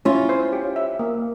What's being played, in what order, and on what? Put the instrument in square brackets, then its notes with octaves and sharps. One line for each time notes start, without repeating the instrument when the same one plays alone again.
[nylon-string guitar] C#4 F4 [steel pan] E4
[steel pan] C5
G4
E5
A#3